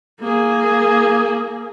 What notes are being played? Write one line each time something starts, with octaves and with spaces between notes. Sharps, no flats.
A#3 G#4